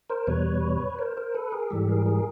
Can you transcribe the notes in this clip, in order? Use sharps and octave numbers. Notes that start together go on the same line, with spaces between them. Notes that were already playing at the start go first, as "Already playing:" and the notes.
A#4 C5
E2 B2 G3 B4 C#5
A#4 C5
A#4 C5
A4 B4
G#4 A#4
G#2 E3 G3 G4 A4
G#4 A#4
G#4 A#4